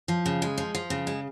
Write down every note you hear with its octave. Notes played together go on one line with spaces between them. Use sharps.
F3
C#3
G#3
F3
F3
C#3
G#3